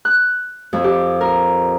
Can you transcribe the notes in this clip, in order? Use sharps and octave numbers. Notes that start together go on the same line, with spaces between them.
F#6
F2
G4
A#4